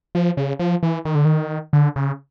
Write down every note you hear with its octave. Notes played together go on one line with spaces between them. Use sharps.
F3
C#3
F3
E3
D#3
D3
D#3
D3
C#3